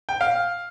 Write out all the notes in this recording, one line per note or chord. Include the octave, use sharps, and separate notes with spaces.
G5
F5